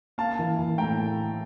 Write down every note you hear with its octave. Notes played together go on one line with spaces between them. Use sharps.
A#3 F5 A5
E3
E3
A2 G5 A#5